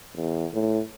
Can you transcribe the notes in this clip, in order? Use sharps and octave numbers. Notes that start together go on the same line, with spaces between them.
E2
A2